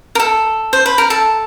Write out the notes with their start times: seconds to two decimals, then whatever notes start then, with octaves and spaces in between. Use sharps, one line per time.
0.15 A#4
0.20 A4
0.73 C5
0.86 B4
0.98 A#4
1.10 A4